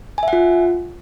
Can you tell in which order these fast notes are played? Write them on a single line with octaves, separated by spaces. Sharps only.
G#5 E5 F#5 F4